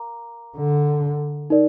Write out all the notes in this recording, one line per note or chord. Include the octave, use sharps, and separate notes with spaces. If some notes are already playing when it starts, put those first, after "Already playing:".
Already playing: A#4 F5 A#5 D6
D3
D#4 A#4 D5